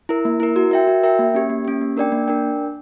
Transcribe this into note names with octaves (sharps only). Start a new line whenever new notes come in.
E4 A#4
A#3
E4 A#4
F#4
A#4 E5 G5
F#4
A#4 E5 G5
A#3
C#4 G4
A#3
C#4 G4
A#3
D4 A#4 D5 G5
A#3
D4 A#4 D5 G5